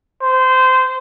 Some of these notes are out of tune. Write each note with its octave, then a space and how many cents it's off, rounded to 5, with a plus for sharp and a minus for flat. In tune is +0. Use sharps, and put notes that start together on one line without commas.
C5 -20